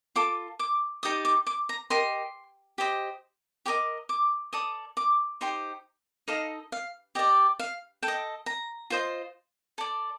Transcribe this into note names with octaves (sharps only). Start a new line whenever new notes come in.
F4 A4 D6
D6
D#4 G4 D5 D#6
D6
D6
A#5
G4 A#4 D#5 C6
G4 C5 D#5
G4 A#4 D#5 D6
D6
A4 D5 D#6
D6
D#4 G4 C5 C6
D#4 A4 D#5 F5
F5
G4 D5 D#5
F5
A4 G5
D#5
A#5
F4 C5 D#5
A4 D5